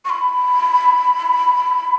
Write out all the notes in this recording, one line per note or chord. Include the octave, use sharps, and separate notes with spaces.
C#6
B5